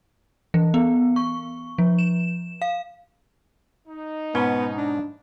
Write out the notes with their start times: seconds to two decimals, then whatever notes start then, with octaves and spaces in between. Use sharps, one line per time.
0.54 E3
0.74 B3
1.16 C#6
1.78 F3
1.99 E7
2.62 F5
3.88 D#4
4.35 G#2 B2 B3 C#4
4.78 D4